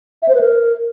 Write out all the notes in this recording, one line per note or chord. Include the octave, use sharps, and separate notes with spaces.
E5
C5
B4
A#4